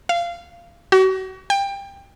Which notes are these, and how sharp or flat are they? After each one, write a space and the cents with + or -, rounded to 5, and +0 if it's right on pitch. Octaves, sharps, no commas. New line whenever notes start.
F5 -20
F#4 +35
G5 +20